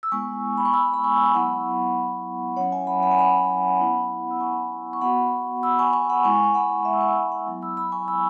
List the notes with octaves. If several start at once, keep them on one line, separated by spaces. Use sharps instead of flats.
E6
G#3 B3 E4 G#5 C#6
B5
C#6
B5 E6
B5
G#5 C#6
E6
C#6
F#3 B3 E4 F#5 B5
F#3 C#4 E4 C#5 F#5
E5 G#5
F#5 B5
F#5 B5
G#5
F#5 B5
B3 E4
E6
G#5 C#6
C#6
B3 F#4 F#5 B5
B5 E6
G#5 C#6
G#5 C#6
F#5 B5
G#3 E4 G#5 C#6
C#6
F#5 B5
E5 G#5
E6
G#5 C#6
E6
G#5 C#6
F#5 B5
F#3 B3 E4
B5 E6
B5 E6
G#5 C#6
B5 E6